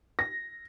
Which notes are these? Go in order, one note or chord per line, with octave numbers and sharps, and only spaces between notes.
A#6